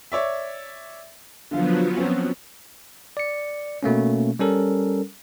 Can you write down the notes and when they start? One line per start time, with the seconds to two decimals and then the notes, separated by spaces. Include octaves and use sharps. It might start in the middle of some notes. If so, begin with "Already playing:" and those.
0.12 C#5 D5 E5
1.51 D3 F3 F#3 B3 F4 F5
1.97 C4 C#4
3.17 D5 C#7
3.83 B2 A3 A#3 C#4
4.39 G3 C#4 A4 A#4